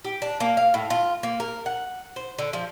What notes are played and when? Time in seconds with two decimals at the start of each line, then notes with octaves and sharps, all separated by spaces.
0.05 G4
0.22 D4
0.40 A#3
0.57 F5
0.74 A2
0.90 F4
1.23 A#3
1.40 A#4
1.66 F#5
2.16 C5
2.39 D3
2.53 F3